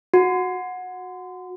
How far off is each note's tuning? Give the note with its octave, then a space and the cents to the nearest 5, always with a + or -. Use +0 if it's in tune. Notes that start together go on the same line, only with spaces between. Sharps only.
F#4 -15